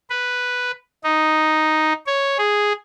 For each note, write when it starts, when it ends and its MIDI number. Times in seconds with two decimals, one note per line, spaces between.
0.10 0.72 71
1.04 1.93 63
2.06 2.37 73
2.38 2.72 68